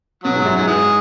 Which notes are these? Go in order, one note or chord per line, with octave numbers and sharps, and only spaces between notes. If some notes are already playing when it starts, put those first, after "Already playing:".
B2 F#3
G#2
F#2
G#2 F#3
E3 G#3